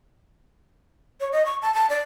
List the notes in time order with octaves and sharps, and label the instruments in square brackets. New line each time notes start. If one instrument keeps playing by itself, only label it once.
[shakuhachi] C#5
D#5
C#6
A5
A5
D5